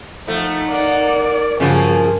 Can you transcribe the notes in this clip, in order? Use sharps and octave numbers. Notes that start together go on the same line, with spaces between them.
F3 A3 D#4 F#5
A#3 D5
G2 C#3 F3 F#3 A#3 G#4